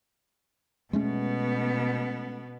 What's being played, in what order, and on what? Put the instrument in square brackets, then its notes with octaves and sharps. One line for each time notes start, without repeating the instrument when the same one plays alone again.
[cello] B2 B3 [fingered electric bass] G#3 A3 C#4